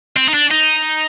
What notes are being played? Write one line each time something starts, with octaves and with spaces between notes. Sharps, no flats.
C4
D#4
D4
D#4